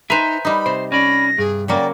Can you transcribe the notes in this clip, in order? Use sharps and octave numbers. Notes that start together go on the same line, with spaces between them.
D#4 B4 C5 E5 G#5 A#5
G3 D#4 B5
C3 C5
C#4 D5 B5 A#6
G2 G#4
C#3 F#3 A#3 D5 G5